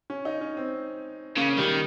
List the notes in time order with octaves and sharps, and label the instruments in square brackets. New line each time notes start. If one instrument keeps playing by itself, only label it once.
[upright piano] C#4
D#4
C#4
C4
[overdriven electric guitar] C#3 [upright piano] A#3
[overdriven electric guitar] D#3 [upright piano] G3